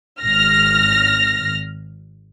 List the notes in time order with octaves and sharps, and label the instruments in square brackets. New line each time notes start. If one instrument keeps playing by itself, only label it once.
[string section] G#1 F6 A#6